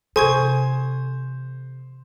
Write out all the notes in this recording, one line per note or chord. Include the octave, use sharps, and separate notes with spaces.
C3 E3 A4 C5 G#5 C#6 G#6